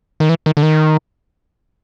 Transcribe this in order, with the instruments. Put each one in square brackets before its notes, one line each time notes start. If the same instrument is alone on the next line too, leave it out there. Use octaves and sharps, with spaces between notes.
[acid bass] D#3
E3
D#3
D3
D#3